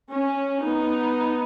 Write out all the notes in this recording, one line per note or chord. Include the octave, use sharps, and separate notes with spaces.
C#4
B3 D#4